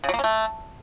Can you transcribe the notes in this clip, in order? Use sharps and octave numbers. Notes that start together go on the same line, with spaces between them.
C#3
F#3
A#3
C#4
A3